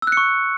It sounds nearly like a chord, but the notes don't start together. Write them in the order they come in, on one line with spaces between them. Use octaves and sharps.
E6 F#6 C#7 C#6